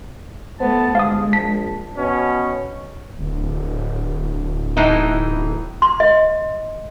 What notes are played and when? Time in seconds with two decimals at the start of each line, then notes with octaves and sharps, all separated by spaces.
0.60 A3 B3 C5 A5
0.95 G1 G#3 F5 D#6
1.33 A#1 A5 B6
1.97 B2 C#4
3.19 D1
4.77 A2 E3 D#4
5.82 C6
6.00 D#5